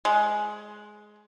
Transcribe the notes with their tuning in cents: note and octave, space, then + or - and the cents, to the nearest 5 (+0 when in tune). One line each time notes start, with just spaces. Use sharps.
G#3 +15